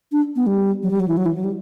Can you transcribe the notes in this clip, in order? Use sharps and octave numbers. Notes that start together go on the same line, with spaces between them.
D4
B3
G3
F#3
G3
F#3
E3
F#3
E3
F#3
G3